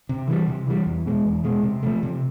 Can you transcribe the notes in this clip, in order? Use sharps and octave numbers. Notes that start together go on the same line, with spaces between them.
C3
E3 G3
C3
E3 G3
E2
B2 G#3
E2
B2 G#3
C3
F3 A3
C3